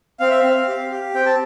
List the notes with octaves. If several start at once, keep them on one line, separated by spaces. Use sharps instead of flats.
C4 F5
E5
F5
C4
G4
G4
C4 G5
A5